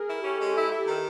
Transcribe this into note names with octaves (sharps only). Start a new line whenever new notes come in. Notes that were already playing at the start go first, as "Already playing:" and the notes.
Already playing: G#4 A#4
E4
C#4 G4 A4
G#3
E4
E4
D#3